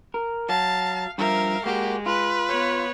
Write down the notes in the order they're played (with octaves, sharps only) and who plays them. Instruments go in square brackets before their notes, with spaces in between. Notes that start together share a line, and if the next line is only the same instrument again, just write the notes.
[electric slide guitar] A#4
[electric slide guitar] F#3 [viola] F5 [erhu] A5
[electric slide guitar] G2 F3 [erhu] A#4 [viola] E5 F5
[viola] G#3 [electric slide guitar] A#3 F#4 [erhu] G4
[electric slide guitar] F4 [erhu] B4
[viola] B3 C#5